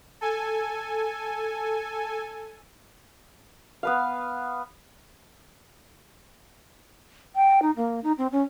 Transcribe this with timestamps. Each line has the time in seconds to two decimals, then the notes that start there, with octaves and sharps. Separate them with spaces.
0.21 A4 G#5
3.83 B3 B4 F5
7.35 G5
7.62 D#4
7.76 A#3
8.03 D#4
8.18 C4
8.32 C#4